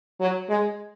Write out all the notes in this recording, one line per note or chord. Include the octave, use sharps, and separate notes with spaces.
F#3
G#3